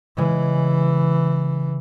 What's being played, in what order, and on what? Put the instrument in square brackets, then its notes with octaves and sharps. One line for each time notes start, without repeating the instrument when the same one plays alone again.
[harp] C#3 G#3 [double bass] E3